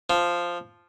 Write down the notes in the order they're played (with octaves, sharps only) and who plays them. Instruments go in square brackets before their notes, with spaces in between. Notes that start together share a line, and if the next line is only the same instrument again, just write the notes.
[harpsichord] F3